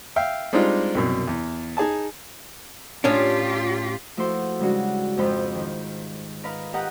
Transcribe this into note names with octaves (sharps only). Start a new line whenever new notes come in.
E5 F5 G5
G3 G#3 C4 D4 D#4 F4
C2 F#2 B2
E2
D#4 G#4 G#5 A5
A2 C#4 D4 F4 G4
F3 A3 E4 F#4 C5 C6
C#3 G3 G#3 D4 F#4
F2 G#2 F3 F4 G5 B5
D#3
A#4 B4 D#5 F5 B5
G4 A#4 D#5 F#5 A#5 F#6